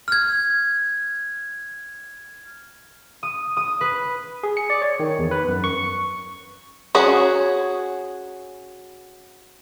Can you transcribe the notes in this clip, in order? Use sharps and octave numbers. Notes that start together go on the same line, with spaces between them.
F6 G#6
D#6
D#6
B4
G#4
C#7
D5
C#5
D#3
E2
B4
F#2
C#6
C#4 F#4 G#4 F#5